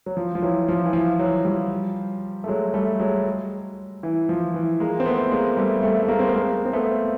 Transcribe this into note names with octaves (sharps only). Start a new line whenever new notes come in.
F#3
F3
F3
E3 F#3
F3
E3
F3
E3 F#3
F3 G3
A3
F#3 G#3
G3 A3
F#3 G#3
E3
F3
E3
G#3 A#3
C4
A3 B3
G#3 A#3
G3 A3
G3 A3
A3
G#3 A#3
C4
B3
G#3 A#3
C4
A3 B3